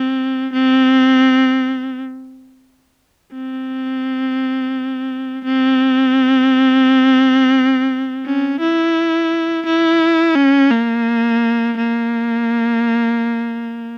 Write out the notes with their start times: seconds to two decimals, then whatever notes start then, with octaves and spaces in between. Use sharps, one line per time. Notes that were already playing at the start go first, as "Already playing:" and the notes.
Already playing: C4
0.53 C4
3.33 C4
5.45 C4
8.26 C#4
8.60 E4
9.66 E4
10.36 C#4
10.71 A#3
11.77 A#3